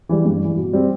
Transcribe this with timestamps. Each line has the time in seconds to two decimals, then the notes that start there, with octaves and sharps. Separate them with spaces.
0.09 E3 G3
0.25 G2
0.41 E3 G3
0.57 B2
0.73 G3 C4